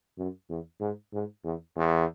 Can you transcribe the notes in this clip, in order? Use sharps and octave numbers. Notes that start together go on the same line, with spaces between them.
F#2
E2
G#2
G#2
E2
E2